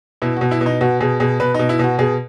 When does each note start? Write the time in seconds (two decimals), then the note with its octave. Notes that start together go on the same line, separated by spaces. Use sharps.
0.22 B2 E4
0.37 B2 F#4
0.51 E4
0.61 B2
0.66 D#4
0.81 B2 F#4
1.00 B2 G#4
1.20 B2 G#4
1.40 B2 B4
1.54 B2 D#4
1.69 E4
1.79 B2 F#4
1.99 B2 G#4